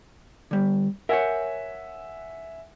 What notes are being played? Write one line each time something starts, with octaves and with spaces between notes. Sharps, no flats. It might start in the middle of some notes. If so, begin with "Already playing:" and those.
D3 G3
A#4 C#5 E5 F#5 G#5